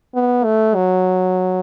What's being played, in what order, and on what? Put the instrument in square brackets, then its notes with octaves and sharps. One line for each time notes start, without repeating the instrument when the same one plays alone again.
[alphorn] B3
A3
F#3